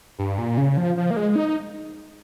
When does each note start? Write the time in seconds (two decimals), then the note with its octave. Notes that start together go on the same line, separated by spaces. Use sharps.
0.19 G2
0.38 A#2
0.57 C#3
0.77 F3
0.97 F3
1.11 A#3
1.16 G#3
1.36 D#4